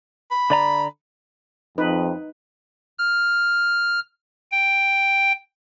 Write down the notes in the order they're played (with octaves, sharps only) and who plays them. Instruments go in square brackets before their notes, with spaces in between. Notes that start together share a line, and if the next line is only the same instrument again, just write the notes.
[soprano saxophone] B5
[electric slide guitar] D3 D5 A#5
[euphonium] F2 [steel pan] D#4 B4
[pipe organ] F6
G5